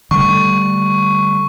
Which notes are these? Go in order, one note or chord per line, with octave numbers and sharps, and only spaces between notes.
D3 G3 A3 C#6